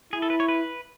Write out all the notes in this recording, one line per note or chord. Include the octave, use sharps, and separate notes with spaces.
E4 G#4
A4
B4
C#5
B4